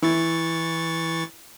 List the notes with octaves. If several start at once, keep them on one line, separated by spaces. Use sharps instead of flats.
E3 E4 C#6 A6